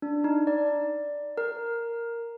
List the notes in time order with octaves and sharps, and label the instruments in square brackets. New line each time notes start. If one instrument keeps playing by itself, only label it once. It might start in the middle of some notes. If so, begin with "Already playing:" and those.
[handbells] D4
D#4
D5
A#4